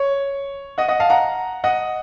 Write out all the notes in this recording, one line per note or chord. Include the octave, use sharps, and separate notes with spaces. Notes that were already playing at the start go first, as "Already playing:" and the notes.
Already playing: C#5
D#5 F#5
D#5 F#5
F5 A5
F#5 A#5
D#5 F#5